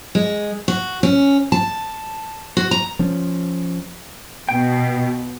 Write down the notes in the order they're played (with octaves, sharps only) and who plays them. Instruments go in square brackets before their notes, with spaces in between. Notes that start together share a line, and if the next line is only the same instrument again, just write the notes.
[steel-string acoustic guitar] G#3
F#4
C#4
A5
F#4
A#5
[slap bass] F3 C#4
[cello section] B2 [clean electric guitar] G5